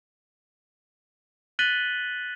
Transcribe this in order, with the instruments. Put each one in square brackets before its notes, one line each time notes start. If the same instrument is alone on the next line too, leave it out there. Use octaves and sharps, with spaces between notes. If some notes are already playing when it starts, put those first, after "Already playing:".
[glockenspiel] F#6 A6 B6 D#7 F#7 G7